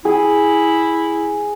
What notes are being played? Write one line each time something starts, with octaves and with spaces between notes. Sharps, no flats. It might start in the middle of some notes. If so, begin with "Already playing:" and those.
E4 G#4